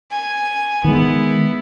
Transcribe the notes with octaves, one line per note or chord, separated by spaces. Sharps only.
G#5
D#3 G#3 B3 E4